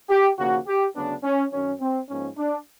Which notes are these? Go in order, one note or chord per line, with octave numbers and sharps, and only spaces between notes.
G4
D#2 C#3 F3 A#3 F#4
G4
D2 C#3 F#3 B3 D4
C#4
F#2 D#3 F#3 C#4
C4
G#2 F3 A#3 C#4
D4